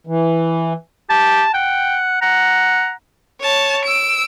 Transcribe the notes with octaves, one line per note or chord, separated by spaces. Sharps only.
E3
G4 A5
F#5 G5
F#5 A#5
C#5 A5
E6 D7